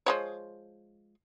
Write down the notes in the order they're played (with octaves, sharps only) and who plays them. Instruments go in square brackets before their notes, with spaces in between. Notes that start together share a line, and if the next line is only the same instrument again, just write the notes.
[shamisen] F3 G#3 C#5